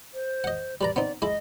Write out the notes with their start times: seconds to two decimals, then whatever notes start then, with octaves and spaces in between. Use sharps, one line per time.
0.14 C5
0.44 D#5 F#5
0.81 G3 B4 D5 A#5
0.96 B3 C4 D#4 D5
1.22 G#3 E4 D#5